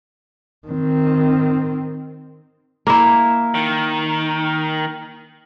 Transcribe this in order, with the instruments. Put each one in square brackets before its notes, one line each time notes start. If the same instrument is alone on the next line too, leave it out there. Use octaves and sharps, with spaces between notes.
[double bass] D#3 C4
[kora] A#3 E4
[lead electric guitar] D#3